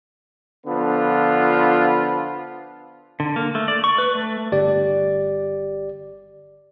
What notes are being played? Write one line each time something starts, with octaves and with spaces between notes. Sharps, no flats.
D3 F3 B3 F4
D3
A#3
A3
D5
C#6
B4
A3
G1 G4 D5